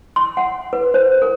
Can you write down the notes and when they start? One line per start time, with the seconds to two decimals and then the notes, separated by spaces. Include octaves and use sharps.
0.16 C6
0.37 F#5
0.73 B4
0.94 C5
1.22 A#4